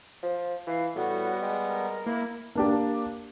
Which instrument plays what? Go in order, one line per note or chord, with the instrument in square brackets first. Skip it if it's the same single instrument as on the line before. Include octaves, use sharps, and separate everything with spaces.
[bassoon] F3
[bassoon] E3 [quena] F5
[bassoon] A2 [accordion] G3 B3 [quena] F#4
[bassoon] G#3 [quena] G5
[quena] A#4
[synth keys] A#3 [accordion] E4
[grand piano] A#3 D4 G4